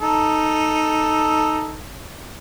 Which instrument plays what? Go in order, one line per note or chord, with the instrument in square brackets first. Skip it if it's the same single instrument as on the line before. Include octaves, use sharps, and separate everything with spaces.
[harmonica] D#4 A4